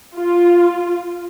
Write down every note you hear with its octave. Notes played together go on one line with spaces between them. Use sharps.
F4